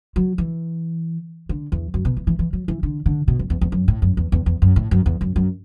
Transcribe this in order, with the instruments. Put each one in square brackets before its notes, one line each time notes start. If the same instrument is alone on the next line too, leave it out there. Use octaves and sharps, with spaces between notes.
[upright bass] F#3
E3
D3
E2
F#2
B2
E3
E3
E3
F#3
E3
D3
D3
B2
F#2
E2
E2
F#2
A2
F#2
E2
E2
E2
F#2
A2
F#2
E2
F#2
F#2